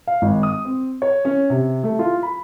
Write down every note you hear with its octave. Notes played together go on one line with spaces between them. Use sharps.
F5
G#1
D#6
C4
C#5
C#4
C3
A3
F4
B5